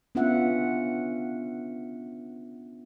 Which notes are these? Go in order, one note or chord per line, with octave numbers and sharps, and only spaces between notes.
B3 C#4 D4 F4 E5 F#5